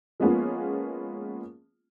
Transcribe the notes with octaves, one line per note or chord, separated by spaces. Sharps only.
F3 G#3 A#3 B3 C#4 F4